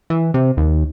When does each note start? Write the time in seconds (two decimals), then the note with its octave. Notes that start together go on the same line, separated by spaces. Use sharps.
0.10 E3
0.34 C3
0.57 D#2